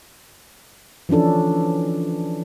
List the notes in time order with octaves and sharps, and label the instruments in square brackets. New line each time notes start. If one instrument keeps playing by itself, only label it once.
[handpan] E3 F3 C#4 D4 A4